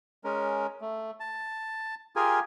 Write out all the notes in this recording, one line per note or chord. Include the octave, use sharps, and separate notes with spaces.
G#3 C#4 A#4
A3
A5
F4 G4 G#4 A#4 G#5